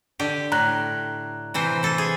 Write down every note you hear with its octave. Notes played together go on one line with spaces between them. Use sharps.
D3 G4
A2 A#5 F#6
C3 E3 C5
E3 A4
G#4